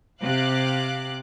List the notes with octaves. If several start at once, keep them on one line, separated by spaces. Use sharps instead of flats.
C3 F5 D6 F#6